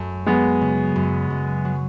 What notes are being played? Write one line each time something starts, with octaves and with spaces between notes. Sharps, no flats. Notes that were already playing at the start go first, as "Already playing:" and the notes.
Already playing: F#2 A3
F#3 G#3 B3
C#3
F#2
F#2
F#3